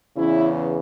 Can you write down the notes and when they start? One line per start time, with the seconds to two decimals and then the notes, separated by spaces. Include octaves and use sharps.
0.16 E2 C#3 E3 C#4 E4